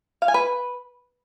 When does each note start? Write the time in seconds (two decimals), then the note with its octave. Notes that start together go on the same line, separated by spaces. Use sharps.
0.22 F5
0.28 G#5
0.34 B4